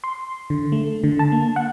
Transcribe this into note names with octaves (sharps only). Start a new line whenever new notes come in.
C6
D3
A3
D3
A5
A#3
F#5